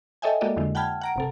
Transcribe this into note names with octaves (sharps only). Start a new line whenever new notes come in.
A4 C#5 D#5 E5 G5 G#5
G#3 A#3 F#4 A4 D5 D#5
F2 D3 G#3 E4
F#5 G5 A5 B5 F6 G#6
F#5 A#5 D7
G1 C3 A4